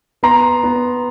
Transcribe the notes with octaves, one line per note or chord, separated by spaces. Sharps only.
B3 A#5 C6
B3